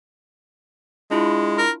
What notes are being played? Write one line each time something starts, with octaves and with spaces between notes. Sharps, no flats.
G#3 D4 E4 F4
A#4